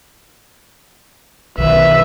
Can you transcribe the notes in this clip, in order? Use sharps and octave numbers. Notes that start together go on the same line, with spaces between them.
B1 D#3 B4 E5